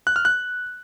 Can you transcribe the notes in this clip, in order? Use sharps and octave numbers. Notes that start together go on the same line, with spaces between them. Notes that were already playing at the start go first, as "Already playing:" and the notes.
F#6
F6
F#6